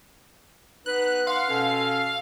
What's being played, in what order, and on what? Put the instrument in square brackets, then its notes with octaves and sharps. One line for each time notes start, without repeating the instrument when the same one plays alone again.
[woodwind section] B3 D#4 B4 [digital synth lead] F#6
[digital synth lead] F5 [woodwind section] F#5 C6
[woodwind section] B2 C#4 A4